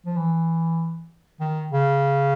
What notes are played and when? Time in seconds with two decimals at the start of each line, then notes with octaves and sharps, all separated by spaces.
0.06 F3
0.16 E3
1.40 D#3
1.72 C#3